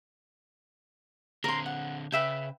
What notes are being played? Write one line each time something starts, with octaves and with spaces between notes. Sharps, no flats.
D3 C4 A#4 C6
F#5
C#3 B4 E5 G5